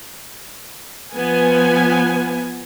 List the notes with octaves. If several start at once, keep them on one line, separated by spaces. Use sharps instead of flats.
F3 B3 G#5